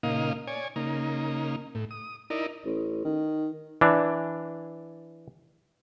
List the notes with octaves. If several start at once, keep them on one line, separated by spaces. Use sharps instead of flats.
A#2 C#3 A#3 D#4 D#5 F5
C#5 D5 G#5
C#3 A#3 D#4
A2
D#6
D#4 E4 A#4 D5 D#5
A1
D#3
E3 D4